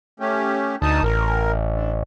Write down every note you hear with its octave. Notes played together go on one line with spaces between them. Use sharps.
A3 C#4 G4
D2 D#4 A5 D#6
A1 A#4
D3